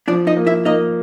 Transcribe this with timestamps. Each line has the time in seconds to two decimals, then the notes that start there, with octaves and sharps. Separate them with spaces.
0.08 F3 D4 D5
0.27 D#4 D#5
0.37 A#3
0.47 E4 E5
0.65 A#3 D#4 D#5